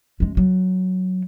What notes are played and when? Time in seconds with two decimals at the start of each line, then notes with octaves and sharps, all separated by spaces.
0.20 F#2 G#3
0.37 F#3